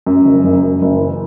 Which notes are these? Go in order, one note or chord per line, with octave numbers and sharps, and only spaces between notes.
F#2
F#1
F#1
F#2
F#1
E3